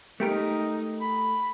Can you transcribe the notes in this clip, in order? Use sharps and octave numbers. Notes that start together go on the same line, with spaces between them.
A3 D#4 G4 A#4
B5